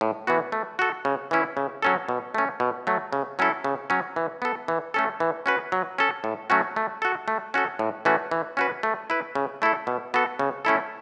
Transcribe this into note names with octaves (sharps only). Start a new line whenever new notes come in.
A2
E3 B3 F#4
A3
F#4 A4
C#3
E3 C#4 E4
C#3
F#3 C#4 A4
B2
A3 C#4
B2
F#3 A3
C#3
F#3 C#4 E4 A4
C#3
F#3 C#4
E3
B3 A4
E3
A3 C#4 A4
E3
C#4 F#4 B4
F#3
C#4 A4
A2
F#3 A3 C#4 F#4
A3
F#4 A4
A3
C#4 F#4 A4
A2
E3 A3 C#4 F#4
E3
C#4 F#4 B4
A3
E4 B4
C#3
A3 E4 A4
B2
B3 F#4 A4
C#3
A3 C#4 E4 A4